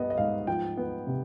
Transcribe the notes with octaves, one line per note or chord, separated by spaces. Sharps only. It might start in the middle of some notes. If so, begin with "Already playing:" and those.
Already playing: G2 G3 B3 D#5
D#5
G#2 F5
F3 G5
B3
C3